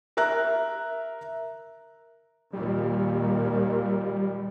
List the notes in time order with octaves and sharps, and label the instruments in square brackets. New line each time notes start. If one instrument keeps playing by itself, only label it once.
[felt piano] A#4 E5 A#5 F#6
[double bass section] D#2 A#2 [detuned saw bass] G3